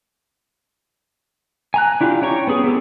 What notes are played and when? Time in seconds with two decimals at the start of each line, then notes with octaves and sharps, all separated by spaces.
1.74 G#5 A#5 F#6
2.01 D4 E4 F4 G4
2.22 C#4 C#5 G5 A#5 C#6
2.47 B3 C#4 G#4
2.64 B3 C4 G4 A4